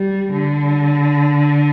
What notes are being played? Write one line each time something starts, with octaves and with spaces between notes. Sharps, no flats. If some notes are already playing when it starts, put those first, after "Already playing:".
Already playing: G3
D3